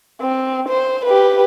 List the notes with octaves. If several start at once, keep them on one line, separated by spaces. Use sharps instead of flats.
C4
C5
G4 B4